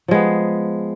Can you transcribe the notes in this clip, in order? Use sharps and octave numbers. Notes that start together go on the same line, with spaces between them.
F3 G#3 B3